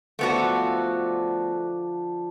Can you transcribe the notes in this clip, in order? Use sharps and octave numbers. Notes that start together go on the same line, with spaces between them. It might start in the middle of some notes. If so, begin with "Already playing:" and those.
D3 F3 A3 B3 D4 F#4